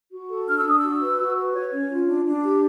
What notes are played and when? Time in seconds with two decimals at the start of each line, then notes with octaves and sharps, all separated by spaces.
0.11 F#4
0.28 A4
0.46 D4 F6
0.58 E6
0.64 D4 D#6
0.79 F#4 E6
1.00 B4
1.17 F#4
1.35 B4
1.53 C#5
1.71 C#4
1.89 F4
2.07 D4
2.24 D4
2.42 G4